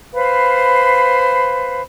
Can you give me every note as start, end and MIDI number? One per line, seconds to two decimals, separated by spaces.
0.14 1.82 71
0.14 1.82 72
0.14 1.82 77
0.14 1.82 83